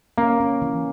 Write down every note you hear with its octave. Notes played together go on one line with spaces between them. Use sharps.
A#3 C#4
C#4
E3